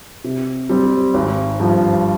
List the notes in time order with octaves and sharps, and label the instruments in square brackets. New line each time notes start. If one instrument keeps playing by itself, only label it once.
[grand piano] C3
G3 C4
G#1
G2 F3